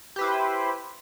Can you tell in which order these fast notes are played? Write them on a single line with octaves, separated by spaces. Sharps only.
G4 B4 E4 C5